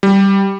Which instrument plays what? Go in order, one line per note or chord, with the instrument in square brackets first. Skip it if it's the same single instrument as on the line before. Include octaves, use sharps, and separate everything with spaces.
[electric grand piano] G3